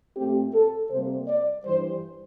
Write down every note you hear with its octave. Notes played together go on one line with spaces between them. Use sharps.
A#2 A3 C4 G4
A4
C3 G3 A#3 C5
D5
G2 E3 G3 C5